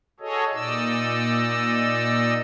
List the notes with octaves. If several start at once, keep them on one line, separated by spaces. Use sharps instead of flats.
F#4 G#4 A4 C#5 D#5
A#2 D#4 D5 D#5 E6